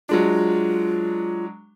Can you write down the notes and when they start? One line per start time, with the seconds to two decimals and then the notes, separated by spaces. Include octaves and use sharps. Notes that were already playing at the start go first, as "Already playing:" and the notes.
0.09 F#3 G#3 D4 F4